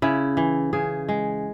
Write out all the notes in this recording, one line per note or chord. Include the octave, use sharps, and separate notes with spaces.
C#3 E4
E3
C#3 G#4
G#3